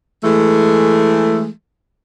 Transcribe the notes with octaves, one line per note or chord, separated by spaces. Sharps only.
E3 G#3 A3